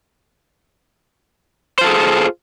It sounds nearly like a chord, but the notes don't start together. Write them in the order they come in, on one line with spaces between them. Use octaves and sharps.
C5 F4 A4 G#4